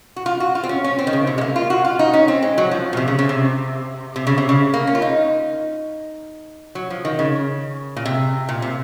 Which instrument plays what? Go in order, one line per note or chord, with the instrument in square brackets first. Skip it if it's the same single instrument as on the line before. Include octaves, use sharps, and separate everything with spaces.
[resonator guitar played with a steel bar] F#4
F4
F#4
F4
C4
C#4
C#4
C4
D#3
C#3
C3
G#3
A#3
F4
F#4
F4
D#4
C#4
C4
G#3
F#3
F3
A#2
C3
C#3
C#3
C3
C3
C#3
C3
C#3
A#3
C#4
F4
D#4
F#3
F3
D#3
C#3
A#2
C3
A#2
C3